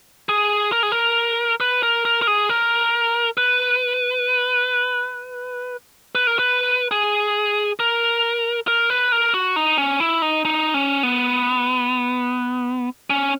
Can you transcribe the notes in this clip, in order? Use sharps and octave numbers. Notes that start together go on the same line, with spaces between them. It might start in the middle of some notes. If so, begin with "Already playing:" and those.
G#4
A#4
G#4
A#4
B4
A#4
A#4
A#4
G#4
A#4
B4
B4
A#4
B4
G#4
A#4
A#4
B4
A#4
F#4
D#4
C#4
E4
D#4
D#4
C#4
B3
C#4